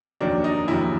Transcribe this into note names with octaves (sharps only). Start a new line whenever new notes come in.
F1 D#2 D#3 F#3 D4
D#4
F1 D#2 D#3 F#3 E4